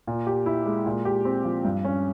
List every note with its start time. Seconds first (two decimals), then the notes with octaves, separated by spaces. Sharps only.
0.07 A#2
0.27 G4
0.46 E4
0.66 G#3
0.86 A#2
1.05 G4
1.25 C4
1.44 F3
1.65 G2
1.85 C#4